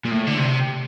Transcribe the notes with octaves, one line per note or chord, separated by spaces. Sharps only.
A#2
A2
D3
C3